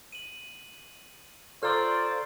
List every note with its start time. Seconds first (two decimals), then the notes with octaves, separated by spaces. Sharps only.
0.13 D#7 F#7
1.63 F4 A4 C5 D5 A#5 C#6 E6 F6